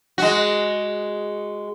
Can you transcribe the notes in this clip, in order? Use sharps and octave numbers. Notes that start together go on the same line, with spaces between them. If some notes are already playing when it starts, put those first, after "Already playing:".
G#3 F#4